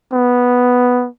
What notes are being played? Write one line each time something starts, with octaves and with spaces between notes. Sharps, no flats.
B3